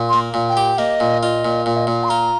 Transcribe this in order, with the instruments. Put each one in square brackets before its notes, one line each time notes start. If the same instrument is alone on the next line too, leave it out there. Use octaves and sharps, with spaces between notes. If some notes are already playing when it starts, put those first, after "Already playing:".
Already playing: [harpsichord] A#2
[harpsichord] A#3 [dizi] C6
[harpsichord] A#2
[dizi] G5
[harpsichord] G4
[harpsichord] A#3 [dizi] D#5
[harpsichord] A#2
[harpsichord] F4 [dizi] D#5
[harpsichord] A#2
[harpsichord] A#2 [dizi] F5
[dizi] D#5
[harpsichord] A#2 [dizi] F5
[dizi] C6
[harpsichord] F4 [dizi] A#5